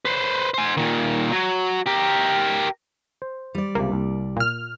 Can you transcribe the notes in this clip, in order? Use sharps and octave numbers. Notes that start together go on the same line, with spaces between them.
B4 C5
C5 G#5
A#2 D#3
F#3
G4 A#4
C5
G3 D5
C#2 C3 A#3
C2
A#2 F6